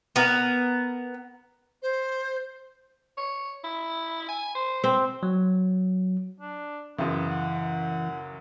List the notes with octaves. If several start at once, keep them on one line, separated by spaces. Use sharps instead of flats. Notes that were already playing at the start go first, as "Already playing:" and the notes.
B3 A#4
C5
C#5
E4
G#5
C5
C4
F#3
D4
C#2 F#2 E3 B3
F#5